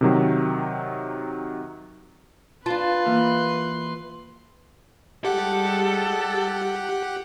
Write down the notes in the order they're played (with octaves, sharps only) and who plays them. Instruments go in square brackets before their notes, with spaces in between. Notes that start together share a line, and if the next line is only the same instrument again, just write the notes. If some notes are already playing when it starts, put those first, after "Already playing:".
[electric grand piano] C3 D#3 F#3
[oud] D4 F4 [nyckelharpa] B4 C6 [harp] A5
[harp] E3 A#3 A#4
[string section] G3 G#3 [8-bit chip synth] G4 F#5 [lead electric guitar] A4